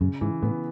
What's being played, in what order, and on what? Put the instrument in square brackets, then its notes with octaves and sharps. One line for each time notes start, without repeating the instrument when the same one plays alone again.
[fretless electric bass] F#2 [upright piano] C#3
[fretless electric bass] G#2 [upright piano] E3
[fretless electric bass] A2 [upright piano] B3